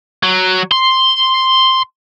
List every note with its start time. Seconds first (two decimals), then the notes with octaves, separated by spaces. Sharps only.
0.23 F#3
0.71 C6